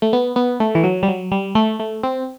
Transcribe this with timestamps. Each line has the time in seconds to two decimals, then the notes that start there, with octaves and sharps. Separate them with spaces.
0.02 A3
0.13 B3
0.36 B3
0.60 A3
0.75 E3
0.84 F#3
1.03 G3
1.08 F#3
1.32 G3
1.55 A3
1.80 A3
2.03 C4